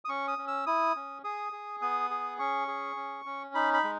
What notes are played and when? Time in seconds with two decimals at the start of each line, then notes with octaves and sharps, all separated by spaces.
0.05 D#6
0.09 C#4 C#6
0.28 D#6
0.38 C#4
0.48 E6
0.66 E4 D#6
0.96 C#4
1.24 G#4 D#6
1.52 G#4
1.81 B3 D#6
2.11 G#4
2.39 C#4 C#6
2.68 G#4
2.96 C#4
3.26 C#4
3.55 D#4 B5
3.74 B5
3.84 G#3